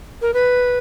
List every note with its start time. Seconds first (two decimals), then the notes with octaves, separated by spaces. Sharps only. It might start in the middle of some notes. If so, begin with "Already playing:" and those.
0.22 A#4
0.34 B4